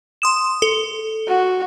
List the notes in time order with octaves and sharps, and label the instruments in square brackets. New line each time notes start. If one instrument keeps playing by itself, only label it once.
[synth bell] C6 D#6 E7
A4
[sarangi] F#4